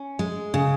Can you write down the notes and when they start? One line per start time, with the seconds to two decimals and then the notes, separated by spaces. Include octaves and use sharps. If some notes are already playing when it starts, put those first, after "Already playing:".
Already playing: C#4
0.19 G#3
0.54 C#3